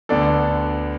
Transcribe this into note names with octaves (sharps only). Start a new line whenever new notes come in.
D2 D3 B3 D4 A4 D5